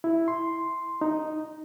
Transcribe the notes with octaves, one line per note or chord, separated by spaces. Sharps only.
E4
C6
D#4